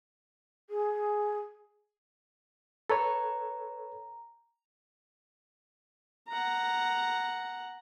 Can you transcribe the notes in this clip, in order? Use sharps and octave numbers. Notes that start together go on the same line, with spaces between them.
G#4
A4 B4 C#5 A#5
F#5 A#5